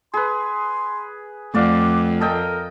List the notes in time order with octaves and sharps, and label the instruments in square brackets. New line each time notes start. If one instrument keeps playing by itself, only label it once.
[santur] G#4 B4 [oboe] C6
[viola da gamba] F2 [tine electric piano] A3 [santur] D5 F5 F#5 [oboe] D6
[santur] A4 D#5 G5 [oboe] A#4